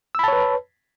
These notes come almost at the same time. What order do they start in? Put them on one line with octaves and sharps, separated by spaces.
E6 B5 A5 C#5 B4